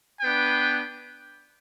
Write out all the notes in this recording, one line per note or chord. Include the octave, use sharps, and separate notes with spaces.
B3 D4 B4 G5